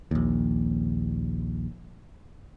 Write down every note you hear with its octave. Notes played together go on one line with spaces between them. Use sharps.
A#1 D#2